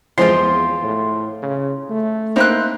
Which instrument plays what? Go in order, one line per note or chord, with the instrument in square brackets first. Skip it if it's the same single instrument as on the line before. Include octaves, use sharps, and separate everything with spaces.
[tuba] E2 [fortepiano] F3 G#3 C4 [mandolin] F4 C6
[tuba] A2
C#3
A3
[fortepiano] A#3 C4 D#4 [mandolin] E4 C5 F#6